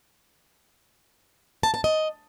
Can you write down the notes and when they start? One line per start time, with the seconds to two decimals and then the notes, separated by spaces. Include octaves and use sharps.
1.63 A5
1.74 A5
1.84 D#5